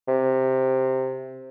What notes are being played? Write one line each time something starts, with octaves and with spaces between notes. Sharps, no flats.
C3